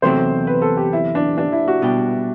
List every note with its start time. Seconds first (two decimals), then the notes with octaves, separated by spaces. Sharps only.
0.02 E2 C3 F#3 A3 C4 C5
0.47 B4
0.62 A4
0.77 G4
0.93 E4
1.15 D4
1.38 D4
1.52 E4
1.68 F#4
1.82 B2 G3 D4 G4